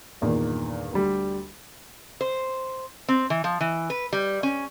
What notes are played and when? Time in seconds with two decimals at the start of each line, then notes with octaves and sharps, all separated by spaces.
0.21 G1 E2 A#2 D#3 A#3
0.92 D2 G3
2.21 C5
3.08 C4
3.30 E3
3.44 F3
3.61 E3
3.90 B4
4.13 G3
4.43 C#4